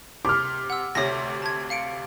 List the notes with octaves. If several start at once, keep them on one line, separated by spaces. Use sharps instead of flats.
C3 D6 F6
F#5 E6
D2 C3 C#5 E5 A#6
A5 G#6
F5 C#7 D7